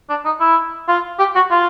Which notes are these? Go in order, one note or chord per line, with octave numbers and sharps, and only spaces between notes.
D4
D#4
E4
F4
G4
F#4
F4